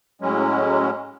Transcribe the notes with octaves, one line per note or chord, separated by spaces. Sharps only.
A2 F#3 G#3 C#4